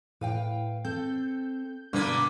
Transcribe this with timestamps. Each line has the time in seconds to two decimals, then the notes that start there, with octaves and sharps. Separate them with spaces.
0.21 A2 B4 F5 G5
0.85 C4 A4 G6
1.93 G2 B2 D3 A#3 B4